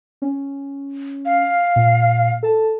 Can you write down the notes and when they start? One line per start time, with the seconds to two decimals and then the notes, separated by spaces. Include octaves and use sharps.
0.22 C#4
1.25 F5
1.76 A#2
2.43 A4 A5